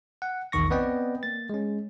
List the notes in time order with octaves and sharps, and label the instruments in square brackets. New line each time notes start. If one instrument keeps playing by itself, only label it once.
[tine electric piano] F#5
A#1 E2 D#3 C#6 A#6
B3 C4 B4 D5 D#5 G5
A#3 A6
G#3 C#4